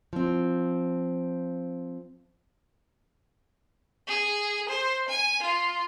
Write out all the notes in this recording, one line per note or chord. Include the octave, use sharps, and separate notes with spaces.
F3 C4
G#4
C5
G#5
F4